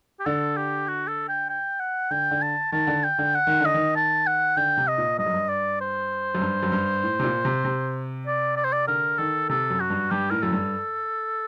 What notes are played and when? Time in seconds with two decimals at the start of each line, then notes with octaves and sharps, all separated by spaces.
0.20 G4
0.26 D3 A4
0.57 G4
0.88 F#4
1.08 A4
1.29 G5
1.49 G5
1.80 F#5
2.11 D3 G5
2.31 D3
2.42 A5
2.72 D#3 A5
2.87 D3
3.04 G5
3.18 D3
3.34 F#5
3.47 D#3
3.61 D3 D#5
3.74 D#3
3.96 A5
4.27 F#5
4.57 D3 G5
4.77 C3
4.88 D#5
4.98 A#2
5.18 G2 D#5
5.26 F#2
5.34 G2
5.49 D5
5.81 C5
6.35 F#2
6.41 G2
6.63 F#2
6.72 G2
7.03 A2
7.19 C3
7.23 A#2
7.45 C3
7.65 C3
8.27 D5
8.56 D5
8.64 C5
8.73 D5
8.88 D3 A#4
9.18 D#3 A4
9.49 C3 A4
9.70 F#2
9.80 F#4
9.90 G2
10.11 G2 G4
10.30 A2 A#4
10.42 F#2 A4
10.52 G2